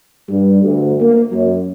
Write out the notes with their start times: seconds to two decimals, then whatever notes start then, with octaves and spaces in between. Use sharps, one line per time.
0.29 G2
0.63 D2
1.01 A#3
1.32 F#2